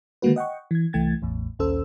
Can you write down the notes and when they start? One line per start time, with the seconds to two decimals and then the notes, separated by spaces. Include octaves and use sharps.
0.22 D3 D#3 G#3 A#3 F#4 B4
0.36 D#5 F#5 G5 C#6
0.71 E3 G#6
0.93 C2 E3 A3 G5 G#6 A6
1.22 A1 E2 A2
1.59 A#1 D#2 C#4 A4 C5 E6